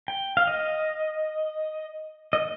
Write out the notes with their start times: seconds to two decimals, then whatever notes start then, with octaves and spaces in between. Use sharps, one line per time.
0.08 G5
0.37 F5
0.47 D#5
2.33 D#5